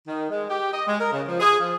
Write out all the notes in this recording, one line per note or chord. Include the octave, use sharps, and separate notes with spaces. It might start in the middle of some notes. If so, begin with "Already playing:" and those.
D#3
G#3
G4
D#5
G#3
A#4
C#3
F3
G#4
F3